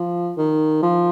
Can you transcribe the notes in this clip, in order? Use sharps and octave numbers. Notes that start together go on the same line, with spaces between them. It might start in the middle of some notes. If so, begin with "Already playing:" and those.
Already playing: F3
D#3
F3